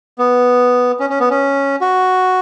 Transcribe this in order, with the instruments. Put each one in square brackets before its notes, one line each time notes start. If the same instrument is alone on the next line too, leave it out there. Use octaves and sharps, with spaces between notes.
[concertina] B3
C#4
C#4
B3
C#4
F#4